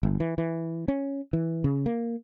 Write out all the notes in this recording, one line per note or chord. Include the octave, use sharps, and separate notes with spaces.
G1
E3
E3
C#4
E3
C#3
A#3